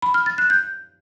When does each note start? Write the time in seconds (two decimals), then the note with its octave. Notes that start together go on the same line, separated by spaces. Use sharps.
0.02 B5
0.14 F6
0.26 A6
0.38 F#6
0.50 G6